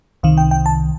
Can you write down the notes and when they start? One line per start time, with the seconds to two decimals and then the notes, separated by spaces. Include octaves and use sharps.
0.23 C2 C3 D#3 F5
0.38 G5
0.51 G5
0.66 A5